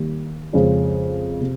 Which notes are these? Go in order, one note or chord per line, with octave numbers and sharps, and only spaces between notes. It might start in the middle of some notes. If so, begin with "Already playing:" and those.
Already playing: D#3 G3 A#3
F2 C#3 G#3 C#4
C3